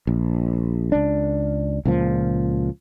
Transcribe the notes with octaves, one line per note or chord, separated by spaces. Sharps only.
A#1
C#2 D4
C#2 A#2 F3